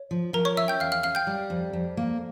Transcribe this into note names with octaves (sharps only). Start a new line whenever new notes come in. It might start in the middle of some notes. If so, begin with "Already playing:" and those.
Already playing: C#5
F3
F3 A#4 A#5
C#5 C#6
C#4 E5 E6
G5 G6
E2 F5 F6
F5 F6
C#4 F5 F6
G5 G6
G3
F2
F2
A#3